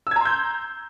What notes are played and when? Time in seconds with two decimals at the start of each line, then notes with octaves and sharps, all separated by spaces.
0.07 E6
0.11 G#6
0.16 A#5
0.21 C6
0.25 G6